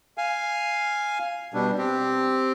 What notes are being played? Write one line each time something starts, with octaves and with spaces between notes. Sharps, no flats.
F5 G#5
B2 G3 D4
C4 G4